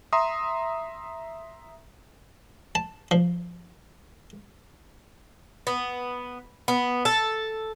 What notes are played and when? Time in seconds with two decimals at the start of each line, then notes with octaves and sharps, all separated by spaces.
0.13 E5 A#5 C6 D#6
2.75 A5
3.11 F3
5.67 B3
6.68 B3
7.05 A4